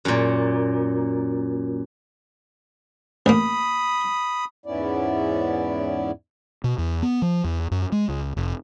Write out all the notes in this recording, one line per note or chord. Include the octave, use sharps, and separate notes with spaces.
F#2 A#2
A1 A#3 B5 D#6
E2 G#2 B3 C#4 E4 D5
B2
E2
B3
F3
E2
F#2
G#3
C#2
F1